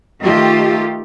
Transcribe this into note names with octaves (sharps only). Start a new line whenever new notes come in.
D#3 A3 F4 G4